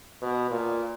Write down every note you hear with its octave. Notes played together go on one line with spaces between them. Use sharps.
B2
A#2